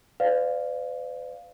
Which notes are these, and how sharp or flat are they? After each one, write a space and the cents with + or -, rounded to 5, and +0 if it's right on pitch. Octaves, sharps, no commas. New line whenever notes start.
B4 +45 D5 +0 F5 +0